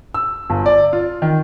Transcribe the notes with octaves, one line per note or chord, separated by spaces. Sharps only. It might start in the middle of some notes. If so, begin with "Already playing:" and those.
E6
G1
D5
F4
D#3